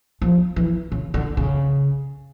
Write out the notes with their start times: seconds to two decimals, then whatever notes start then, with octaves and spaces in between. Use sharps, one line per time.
0.22 F3
0.56 E3
0.92 C#3
1.14 D3
1.37 C#3